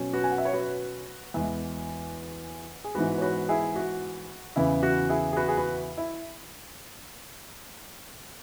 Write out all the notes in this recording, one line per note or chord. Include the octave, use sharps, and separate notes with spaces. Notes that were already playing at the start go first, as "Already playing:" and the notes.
Already playing: B2 F#3 C#4
F#4 B4
G#5
F#5
E5
C#5
F#4 B4
E2 E3 G#3
G#4
G#2 E3 G#3 B3 F#4 B4
C#5
F#4 B4
E4 G#4
F#4
E2 C#3 E3 B3 E4
F#4
E4 G#4
G#4
F#4 B4
G#4
F#4 B4
E4